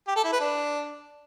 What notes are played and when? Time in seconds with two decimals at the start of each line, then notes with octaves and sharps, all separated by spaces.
0.07 G4
0.16 A4
0.24 E4
0.32 B4
0.41 D4